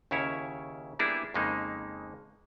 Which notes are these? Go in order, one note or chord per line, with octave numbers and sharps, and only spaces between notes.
D#2 C#3 C#4 E4 C#5
G3 A#3 B3 D4 E4 G#4
F2 C#3 G#3 A#3 D#4